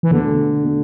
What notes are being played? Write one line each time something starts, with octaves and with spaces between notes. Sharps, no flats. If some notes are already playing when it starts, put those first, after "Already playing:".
E3
E2 B2 D3 A3
B2 A3